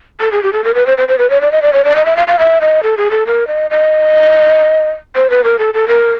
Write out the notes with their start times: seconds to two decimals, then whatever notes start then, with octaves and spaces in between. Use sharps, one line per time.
0.20 A4
0.32 G#4
0.43 G4
0.53 A4
0.64 A#4
0.75 B4
0.87 C5
0.98 C5
1.08 C5
1.18 B4
1.30 C#5
1.41 D5
1.52 D#5
1.62 D5
1.73 C#5
1.85 D5
1.95 D#5
2.06 E5
2.17 F5
2.27 F5
2.39 E5
2.61 D#5
2.83 A4
2.97 G#4
3.11 A4
3.27 A#4
3.47 D#5
3.71 D#5
5.16 C5
5.30 B4
5.44 A#4
5.59 A4
5.74 A4
5.88 A#4